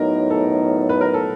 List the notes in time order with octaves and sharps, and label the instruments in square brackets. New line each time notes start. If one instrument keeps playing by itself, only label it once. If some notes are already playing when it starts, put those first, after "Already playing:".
Already playing: [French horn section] A2 F#3 B3 D#4 [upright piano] A#4
[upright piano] A4
B4
A#4
A4